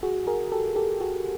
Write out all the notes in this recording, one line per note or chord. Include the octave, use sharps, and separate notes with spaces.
F#4 G#4
G#4 A#4
G4 A4
G4 A4
F#4 G#4